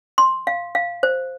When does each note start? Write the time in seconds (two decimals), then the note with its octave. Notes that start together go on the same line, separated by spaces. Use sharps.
0.18 C6
0.47 F5
0.75 F5
1.03 C5